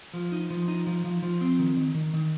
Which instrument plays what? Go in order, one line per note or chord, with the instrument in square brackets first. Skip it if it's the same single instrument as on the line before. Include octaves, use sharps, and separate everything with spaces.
[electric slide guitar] F3
D#4
F3
D#4
F3
F3
F3
C4
D#3
D#3
D#3
D#3